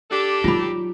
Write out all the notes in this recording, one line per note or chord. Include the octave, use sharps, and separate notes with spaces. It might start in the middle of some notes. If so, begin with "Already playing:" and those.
D4 G4 A4
F#3 D#4 F4 B5